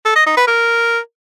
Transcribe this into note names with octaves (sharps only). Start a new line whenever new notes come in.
A4
D#5
D#4
B4
A#4